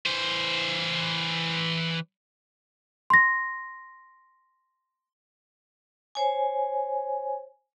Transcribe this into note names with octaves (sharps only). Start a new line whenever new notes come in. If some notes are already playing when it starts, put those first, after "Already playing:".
E3 C5
C6 A#6
C5 C#5 G#5